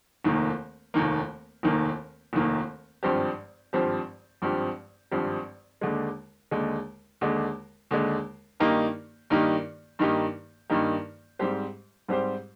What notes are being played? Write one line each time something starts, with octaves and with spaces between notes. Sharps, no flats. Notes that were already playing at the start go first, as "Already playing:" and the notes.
F1 D#2 D#3 A#3
F1 D#2 D#3 A#3
F1 D#2 D#3 A#3
F1 D#2 D#3 A#3
G#1 G2 F3 C4 G4
G#1 G2 F3 C4 G4
G#1 G2 F3 C4 G4
G#1 G2 F3 C4 G4
D#2 D3 G#3
D#2 D3 G#3
D#2 D3 G#3
D#2 D3 G#3
G2 D#3 A#3 D#4 G4
G2 D#3 A#3 D#4 G4
G2 D#3 A#3 D#4 G4
G2 D#3 A#3 D#4 G4
G#2 G3 C4 G4 C5
G#2 G3 C4 G4 C5